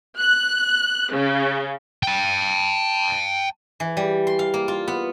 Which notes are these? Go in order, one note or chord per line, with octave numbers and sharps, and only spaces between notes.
F#6
C#3
G5 A5
E3
G3
C6
F5
A#3
F4
B3